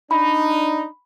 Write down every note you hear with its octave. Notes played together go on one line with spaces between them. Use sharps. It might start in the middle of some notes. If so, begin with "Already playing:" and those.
D4 D#4 B5